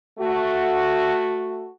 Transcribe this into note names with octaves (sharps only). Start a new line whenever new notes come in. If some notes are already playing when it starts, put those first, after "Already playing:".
A3 F#4